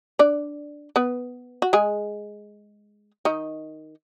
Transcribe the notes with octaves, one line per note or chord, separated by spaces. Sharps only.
D4 D5
B3 B4
F#4
G#3 G#4
D#3 D#4